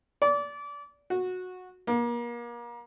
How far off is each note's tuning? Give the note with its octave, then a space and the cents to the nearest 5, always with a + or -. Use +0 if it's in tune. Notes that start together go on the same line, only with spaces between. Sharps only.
D5 -25
F#4 -15
A#3 +35